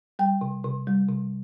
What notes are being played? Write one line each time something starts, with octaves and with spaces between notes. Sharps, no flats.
G3 G5
C3
C3
G3
C3